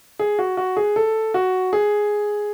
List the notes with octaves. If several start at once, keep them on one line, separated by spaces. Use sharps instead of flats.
G#4
F#4
F#4
G#4
A4
F#4
G#4